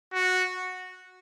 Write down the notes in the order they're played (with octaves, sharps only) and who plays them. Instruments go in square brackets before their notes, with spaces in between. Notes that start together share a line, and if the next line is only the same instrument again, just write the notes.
[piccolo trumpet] F#4